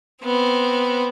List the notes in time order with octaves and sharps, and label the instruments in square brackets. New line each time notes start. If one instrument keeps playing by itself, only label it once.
[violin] B3 C4